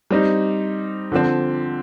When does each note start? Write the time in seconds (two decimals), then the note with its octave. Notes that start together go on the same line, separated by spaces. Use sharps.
0.10 G3 C4 D#4
1.12 D3 F3 C4